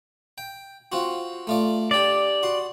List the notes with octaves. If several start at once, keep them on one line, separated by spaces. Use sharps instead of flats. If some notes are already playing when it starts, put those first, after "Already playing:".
G5
C4 F4 F#4
A3 F4 D5
D4 G4 D5
F#4 C6